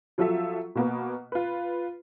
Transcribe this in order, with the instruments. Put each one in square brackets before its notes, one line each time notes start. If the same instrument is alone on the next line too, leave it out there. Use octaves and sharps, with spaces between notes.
[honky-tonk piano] F3 F#3 F4 A4 E5
B2 A#3 B3
F4 B4